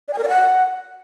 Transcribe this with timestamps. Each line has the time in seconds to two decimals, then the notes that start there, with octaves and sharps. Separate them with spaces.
0.08 D5
0.13 G#5
0.18 A#4
0.23 D5
0.28 F#5